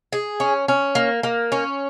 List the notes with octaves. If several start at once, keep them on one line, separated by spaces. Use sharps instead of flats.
G#4
C#4
C#4
A#3
A#3
C#4